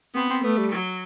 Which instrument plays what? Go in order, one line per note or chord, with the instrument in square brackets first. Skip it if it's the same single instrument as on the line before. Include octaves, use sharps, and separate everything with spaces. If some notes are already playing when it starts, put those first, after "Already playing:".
[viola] B3 [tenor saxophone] C4
[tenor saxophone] C4
[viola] A3 [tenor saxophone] B3
[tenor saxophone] G3
[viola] F#3